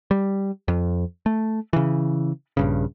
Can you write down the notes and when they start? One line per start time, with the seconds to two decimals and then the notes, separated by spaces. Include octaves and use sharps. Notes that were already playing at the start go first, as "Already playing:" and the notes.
0.11 G3
0.68 F2
1.26 A3
1.73 C#3 E3
2.57 A#1 G2 C#3